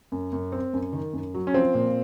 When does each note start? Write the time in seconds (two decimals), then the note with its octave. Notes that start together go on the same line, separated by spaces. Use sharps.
0.12 F#2
0.33 F#2
0.52 C4
0.73 F#2
0.93 D#3
1.13 F#2
1.34 F#3
1.47 C#4
1.54 F3 C4
1.74 A#2